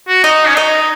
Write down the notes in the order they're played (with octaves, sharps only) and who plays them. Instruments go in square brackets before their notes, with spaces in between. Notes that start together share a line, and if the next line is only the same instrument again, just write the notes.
[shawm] F#4
[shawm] D#4 [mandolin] D#5
[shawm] C#4
[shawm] D#4 [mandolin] D#5